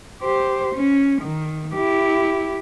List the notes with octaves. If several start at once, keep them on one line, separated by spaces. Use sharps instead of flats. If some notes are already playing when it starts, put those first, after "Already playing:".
G4 C5
C#4
D#3
E4 G4